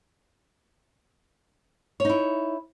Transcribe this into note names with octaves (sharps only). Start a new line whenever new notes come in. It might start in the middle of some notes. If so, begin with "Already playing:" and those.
D#4 E4 C#5